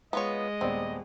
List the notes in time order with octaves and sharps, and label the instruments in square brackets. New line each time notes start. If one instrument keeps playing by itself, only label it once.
[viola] G#3 [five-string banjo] B3 F4 C#5 [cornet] D#5
[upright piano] D#1 B3 D5 [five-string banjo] C4